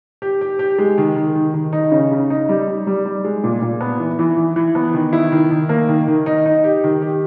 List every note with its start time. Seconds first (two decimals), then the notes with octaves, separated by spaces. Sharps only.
0.22 G4
0.41 G4
0.59 G4
0.78 G#3
0.98 D#3
1.16 D#3
1.35 D#3
1.54 D#3
1.73 D#4
1.91 C#3
2.11 C#3
2.30 D#4
2.49 G3
2.67 G3
2.87 G3
3.05 G3
3.25 G#3
3.44 A#2
3.62 A#2
3.81 B3
4.00 E3
4.19 E3
4.37 E3
4.56 E3
4.75 B3
4.94 D#3
5.13 E4
5.32 D#3
5.51 D#3
5.69 A#3
5.89 D#3
6.07 D#3
6.26 D#4
6.46 D#4
6.64 G4
6.84 D#3
7.02 G4